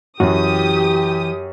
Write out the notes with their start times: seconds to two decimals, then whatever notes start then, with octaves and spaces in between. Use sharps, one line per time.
0.20 F#2 E3 F#4 G4 D#6